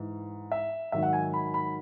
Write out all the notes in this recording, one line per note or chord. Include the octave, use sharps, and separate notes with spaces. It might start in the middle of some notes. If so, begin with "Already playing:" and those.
Already playing: G#2 E3
E5
G#2 D#3 F#3 E5
F#5
G#5
B5
B5